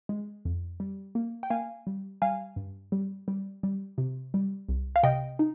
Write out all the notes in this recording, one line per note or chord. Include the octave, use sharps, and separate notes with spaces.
G#3
F2
G3
A#3
G5
A#3 F5 G#5
G3
G3 F5 G#5
G2
G3
G3
G3
C3
G3
C2
F5
C3 D#5 G5
D#4